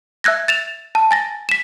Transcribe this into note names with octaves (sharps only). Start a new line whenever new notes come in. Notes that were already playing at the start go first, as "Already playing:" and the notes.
E5 E6 F#6 G#6 A#6
A6 E7 F7
A5
G#5 A6 A#6
B6 E7